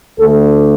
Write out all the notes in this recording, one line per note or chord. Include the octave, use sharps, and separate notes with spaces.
D2 D3 A3 A4